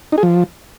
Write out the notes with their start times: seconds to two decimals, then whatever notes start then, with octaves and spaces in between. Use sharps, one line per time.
0.12 D#4
0.18 G#4
0.23 F3